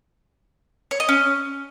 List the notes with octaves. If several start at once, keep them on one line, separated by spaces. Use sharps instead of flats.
C#5
D#5
C#4